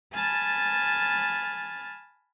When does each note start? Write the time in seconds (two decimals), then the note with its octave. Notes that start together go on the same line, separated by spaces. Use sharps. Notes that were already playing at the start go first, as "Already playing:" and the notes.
0.14 G#5 A5 B5 F6 A6